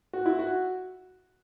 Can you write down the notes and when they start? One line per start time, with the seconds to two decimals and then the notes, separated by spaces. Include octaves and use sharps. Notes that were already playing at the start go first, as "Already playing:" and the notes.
0.13 F#4
0.26 E4
0.39 F#4